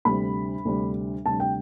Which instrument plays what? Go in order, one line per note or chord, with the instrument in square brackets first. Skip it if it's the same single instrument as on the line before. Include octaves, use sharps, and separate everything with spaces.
[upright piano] D2 C3 G3 D4 B5
D2 C3 G3 D4
D2 C3 G3 D4 A5
G5